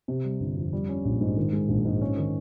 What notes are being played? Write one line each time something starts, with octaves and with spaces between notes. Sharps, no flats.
C3
G3
G1
F2
G3
C#4
A#1
G#2
D#3
G#3
A#1
G#2
C#4
D#3